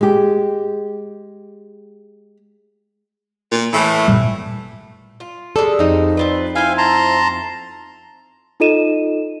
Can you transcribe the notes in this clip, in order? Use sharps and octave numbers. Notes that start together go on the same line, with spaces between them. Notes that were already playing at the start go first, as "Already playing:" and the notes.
G#3 G4
A#2
A2 E3 A3
G1 A#2 G3
F4
G3 G#3 A4
F2 D#4
C4 F4 B4
E4 C5 F5 G5 G#5
A5 A#5 C6
D#4 F4 A4 D#5 D#7 E7